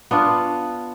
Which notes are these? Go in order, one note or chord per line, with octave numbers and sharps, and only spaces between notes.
B3 D4 F4